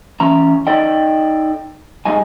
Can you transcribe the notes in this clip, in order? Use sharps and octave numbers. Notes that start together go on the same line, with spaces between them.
E3 C#4 A#5
D#4 A4 D5 D#5 G5
G2 G3 G#3 D#4 G#5